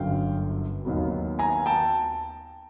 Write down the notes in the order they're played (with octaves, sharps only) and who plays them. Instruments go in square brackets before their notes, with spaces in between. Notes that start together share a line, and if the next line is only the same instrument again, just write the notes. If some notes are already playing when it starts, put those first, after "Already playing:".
Already playing: [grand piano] G1 F#2 D3 F5 G5
D#2 D#3 F#3 B3
G#5 A#5
G5 A5